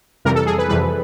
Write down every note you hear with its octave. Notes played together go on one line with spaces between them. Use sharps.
F2 C3 E3 G3 A#4
A4
G#4
B4
F2 C3 E3 G3 B4